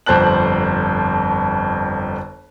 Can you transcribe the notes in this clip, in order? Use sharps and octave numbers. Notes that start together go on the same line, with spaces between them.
G1 F2 C5 A5 F#6 F#7